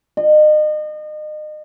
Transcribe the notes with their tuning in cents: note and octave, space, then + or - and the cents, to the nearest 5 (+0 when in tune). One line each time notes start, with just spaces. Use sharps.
D#5 -35